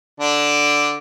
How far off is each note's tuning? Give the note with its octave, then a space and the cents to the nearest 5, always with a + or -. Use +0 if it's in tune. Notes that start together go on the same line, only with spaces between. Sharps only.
D3 +0 D4 +0